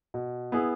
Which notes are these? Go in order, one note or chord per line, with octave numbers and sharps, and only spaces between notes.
B2
B3 E4 G#4